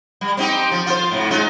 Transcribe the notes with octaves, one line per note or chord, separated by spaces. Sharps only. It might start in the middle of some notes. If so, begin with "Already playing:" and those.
G3
C4 D#4 G4
F3
F4 C5
G#2 C3
G#3 D#4 F4